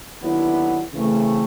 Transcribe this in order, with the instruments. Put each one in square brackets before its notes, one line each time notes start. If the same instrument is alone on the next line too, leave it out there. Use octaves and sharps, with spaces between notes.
[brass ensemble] D#2 D3 F#3 B3 E4
C#3 E3 A3 C4